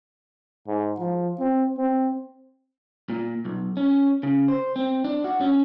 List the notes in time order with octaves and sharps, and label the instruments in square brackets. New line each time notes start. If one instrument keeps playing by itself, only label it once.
[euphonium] G#2
F3
C4
C4
[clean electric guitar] A#2
B1
C#4
C#3
C5
C4
D4
F#4
C#4